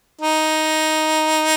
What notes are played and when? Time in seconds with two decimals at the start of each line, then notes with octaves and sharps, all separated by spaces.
0.21 D#4